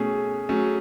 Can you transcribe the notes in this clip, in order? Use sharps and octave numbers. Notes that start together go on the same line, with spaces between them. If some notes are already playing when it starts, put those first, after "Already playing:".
Already playing: B2 A3 C#4 G#4
F#3 A3 C#4 G#4